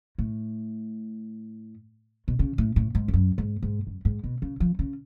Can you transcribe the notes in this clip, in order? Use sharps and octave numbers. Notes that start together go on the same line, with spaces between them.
A2
B2
C#3
A2
A2
G#2
F2
F#2
G#2
G#2
F#2
G#2
B2
C#3
F3
C#3